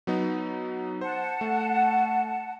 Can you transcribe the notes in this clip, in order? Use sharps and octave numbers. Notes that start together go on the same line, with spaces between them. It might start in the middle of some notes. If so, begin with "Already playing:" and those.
F#3 B3 D#4
C5 F#5 A5
A3